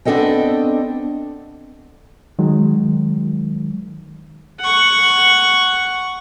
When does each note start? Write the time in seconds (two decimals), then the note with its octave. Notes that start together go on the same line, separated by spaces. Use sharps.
0.05 B3 C4 D4 A4 D#5 G5
2.39 D#3 F#3 G#3
4.60 F#5 C#6